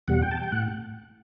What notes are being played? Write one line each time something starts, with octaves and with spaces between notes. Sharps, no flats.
E2 B2 G3 F#5
G5
A5
G5
A2 F#5